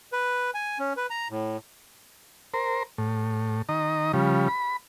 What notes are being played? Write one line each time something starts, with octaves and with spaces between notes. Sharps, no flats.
B4
G#5
C#4
B4
A#5
A2
A#4 C5
A2
D#3 D#5 A#5
C#3 F3 G3
B5